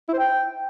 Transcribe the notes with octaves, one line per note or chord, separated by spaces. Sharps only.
E4
C5
G5